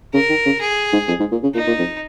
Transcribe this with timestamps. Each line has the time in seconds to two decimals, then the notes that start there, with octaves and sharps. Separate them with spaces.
0.14 C#3 A#4
0.29 D#3
0.46 C#3
0.61 G#4
0.93 G#2
1.08 F2
1.20 G#2
1.31 A#2
1.43 C#3
1.55 A#2 D#4
1.67 A#2
1.78 F2